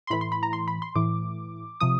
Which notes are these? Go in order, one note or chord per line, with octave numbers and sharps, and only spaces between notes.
C6
A2 E3 B5
C6
B5
A#5
C6
B5
C6
A2 E3 D6
C3 F3 D#6